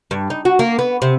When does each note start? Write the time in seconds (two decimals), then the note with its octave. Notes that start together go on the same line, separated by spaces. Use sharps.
0.11 G2
0.30 D#4
0.45 F#4
0.59 A#3
0.79 B3
1.02 C3